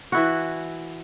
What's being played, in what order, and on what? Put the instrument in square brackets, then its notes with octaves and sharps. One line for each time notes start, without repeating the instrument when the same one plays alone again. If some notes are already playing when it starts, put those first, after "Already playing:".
[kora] E3 E4 F#4